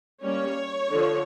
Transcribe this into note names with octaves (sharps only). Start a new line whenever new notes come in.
G3 A#3 C#4 C#5
D3 F3